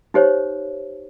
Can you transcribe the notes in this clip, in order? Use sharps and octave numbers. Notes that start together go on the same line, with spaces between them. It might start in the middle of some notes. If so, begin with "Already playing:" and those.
D#4 G4 C5 C#5